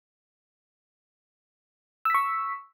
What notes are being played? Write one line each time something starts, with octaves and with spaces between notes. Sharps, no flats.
C#6 E6 B6